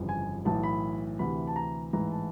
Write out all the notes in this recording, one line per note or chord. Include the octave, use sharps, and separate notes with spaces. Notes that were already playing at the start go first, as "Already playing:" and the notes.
Already playing: G1 F2 C#3 E3
G#5
B1 A2 E3 A5
B5
D2 C3 E3 B5
A5
A#5
A1 G#2 E3 A#5
A5